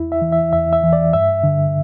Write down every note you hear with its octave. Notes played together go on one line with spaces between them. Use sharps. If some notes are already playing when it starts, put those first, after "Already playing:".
Already playing: E2 E4
E5
E3
E5
E2 E5
E5
E3
D5
G2 E5
D3